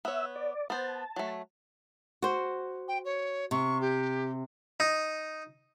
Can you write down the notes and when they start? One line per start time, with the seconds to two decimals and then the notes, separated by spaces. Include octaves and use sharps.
0.05 B3 C#5 E5 E6
0.36 D5
0.70 B3 C5 A5
1.16 F#3 A3
2.22 F#4 C5
2.88 G5
3.04 C#5
3.51 C3 C#6
3.81 G4
4.80 D#4